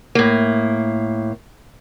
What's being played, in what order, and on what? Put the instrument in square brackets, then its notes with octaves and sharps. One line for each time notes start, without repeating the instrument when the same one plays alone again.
[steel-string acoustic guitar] A2 A#3